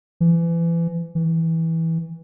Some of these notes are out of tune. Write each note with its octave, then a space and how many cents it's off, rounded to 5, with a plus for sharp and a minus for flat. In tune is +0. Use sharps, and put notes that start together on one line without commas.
E3 +30
E3 -15